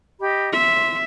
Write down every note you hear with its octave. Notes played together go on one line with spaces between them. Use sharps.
G4 D#5 B5
E5 C6